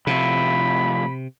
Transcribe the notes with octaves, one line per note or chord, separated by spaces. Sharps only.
A2 C3 F3 E5 B5